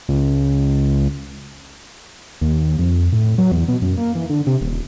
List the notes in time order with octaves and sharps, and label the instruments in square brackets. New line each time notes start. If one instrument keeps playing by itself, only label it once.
[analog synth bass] C#2
[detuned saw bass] D#2
F2
A2
F#3
E2
B2
F#2
A#3
E3
D3
C3
D#1